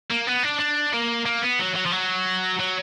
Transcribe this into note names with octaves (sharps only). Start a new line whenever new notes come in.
A#3
B3
D4
D4
A#3
A#3
B3
F#3
F#3
F3
F#3
F#3